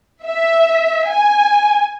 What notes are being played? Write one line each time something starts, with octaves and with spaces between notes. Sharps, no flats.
E5
G#5